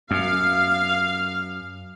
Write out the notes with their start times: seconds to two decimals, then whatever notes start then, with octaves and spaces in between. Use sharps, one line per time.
0.11 F#2 F5